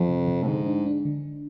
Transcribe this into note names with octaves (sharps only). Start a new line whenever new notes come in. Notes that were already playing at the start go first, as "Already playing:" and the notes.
Already playing: F2 F3 C4
C3
C3
A2
G#2 D3
D4
D4
D3